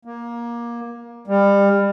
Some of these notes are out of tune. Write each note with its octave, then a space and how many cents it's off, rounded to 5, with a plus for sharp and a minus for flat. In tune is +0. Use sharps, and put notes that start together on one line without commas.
A#3 +20
G3 +30